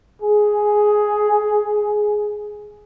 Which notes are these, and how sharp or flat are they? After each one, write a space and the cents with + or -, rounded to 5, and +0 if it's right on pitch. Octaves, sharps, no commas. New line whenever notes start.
G#4 +10